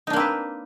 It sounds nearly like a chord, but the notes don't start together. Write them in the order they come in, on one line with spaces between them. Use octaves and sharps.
D#4 D4 A#3 C4 B4